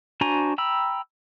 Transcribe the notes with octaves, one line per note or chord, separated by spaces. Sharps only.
D4 F#4 C5 G#5 A#5
G5 A#5 B5 E6